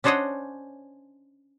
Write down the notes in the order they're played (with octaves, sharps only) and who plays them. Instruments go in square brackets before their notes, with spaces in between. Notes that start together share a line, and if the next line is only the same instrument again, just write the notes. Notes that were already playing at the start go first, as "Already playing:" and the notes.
[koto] C#4 D4 C5 C#5 D#5 F#5